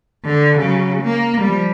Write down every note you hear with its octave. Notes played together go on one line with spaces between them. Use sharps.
D3
C#3 F#3
A#3
F3 G3